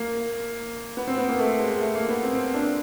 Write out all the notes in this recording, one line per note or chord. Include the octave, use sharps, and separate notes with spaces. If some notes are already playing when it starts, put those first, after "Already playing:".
Already playing: A#3
B3
C4
B3
A#3
A3
G#3
A3
A#3
B3
C4
C4
D4